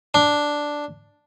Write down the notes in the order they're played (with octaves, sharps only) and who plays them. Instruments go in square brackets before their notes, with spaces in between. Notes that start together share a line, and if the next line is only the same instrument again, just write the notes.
[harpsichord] D4